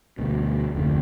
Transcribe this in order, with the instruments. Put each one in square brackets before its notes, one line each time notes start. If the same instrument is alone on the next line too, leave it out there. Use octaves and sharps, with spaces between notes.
[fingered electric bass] D2 B2
F1 D2 D3